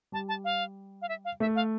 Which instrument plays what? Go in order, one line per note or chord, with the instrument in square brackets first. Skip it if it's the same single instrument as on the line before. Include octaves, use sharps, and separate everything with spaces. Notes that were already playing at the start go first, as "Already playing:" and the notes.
[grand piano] G3 [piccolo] A5
[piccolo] A5
F5
F5
E5
F5
[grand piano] A3 [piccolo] E5
[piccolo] F5